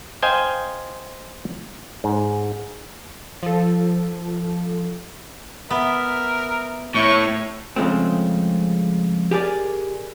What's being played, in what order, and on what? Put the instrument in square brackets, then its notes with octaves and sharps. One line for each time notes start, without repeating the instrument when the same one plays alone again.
[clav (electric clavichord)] C5 D#5 F5 G5 G#5
G#2
[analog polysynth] F3 A4
[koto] B3 [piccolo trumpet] A#4 [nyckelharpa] E5
[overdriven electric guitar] A2 [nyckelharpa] E4 C#5 [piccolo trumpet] C#6
[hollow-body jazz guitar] C#3 F3 G#3 A3 C4
G4 G#4 A#4 D5